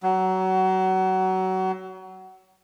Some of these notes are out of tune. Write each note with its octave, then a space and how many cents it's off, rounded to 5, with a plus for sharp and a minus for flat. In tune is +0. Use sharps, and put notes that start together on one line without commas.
F#3 +25